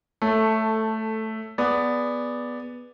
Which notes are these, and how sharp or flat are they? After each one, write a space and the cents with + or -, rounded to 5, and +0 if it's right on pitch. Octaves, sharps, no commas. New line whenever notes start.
A3 +0 A4 +10 C#5 +0
B3 +0 G#4 +5 D5 +0